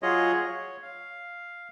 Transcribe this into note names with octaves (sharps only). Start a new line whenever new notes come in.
F#3 F4 G#4 C#5 D#5
C#5
F5